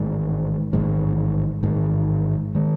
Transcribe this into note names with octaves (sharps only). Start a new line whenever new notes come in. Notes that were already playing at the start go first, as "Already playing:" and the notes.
Already playing: A1 G#2 D#3 G#3
A1 G#2 D#3 G#3
A1 G#2 D#3 G#3
D#3 G#3